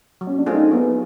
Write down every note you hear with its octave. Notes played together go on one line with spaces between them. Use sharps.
F#3
C#4
D4
A3 C4 F4 G#4
D#4
F#3 B3